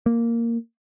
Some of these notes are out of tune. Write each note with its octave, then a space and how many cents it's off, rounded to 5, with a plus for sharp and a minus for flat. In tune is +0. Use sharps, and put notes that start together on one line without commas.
A#3 -5